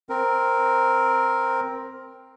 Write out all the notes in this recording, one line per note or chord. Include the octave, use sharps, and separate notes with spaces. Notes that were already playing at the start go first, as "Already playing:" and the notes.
C4 A#4